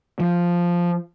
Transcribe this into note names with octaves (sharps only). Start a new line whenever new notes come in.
F3